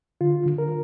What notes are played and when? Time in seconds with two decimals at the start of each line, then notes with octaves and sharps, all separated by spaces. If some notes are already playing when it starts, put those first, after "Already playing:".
0.21 D3 F4
0.46 D3
0.58 A#4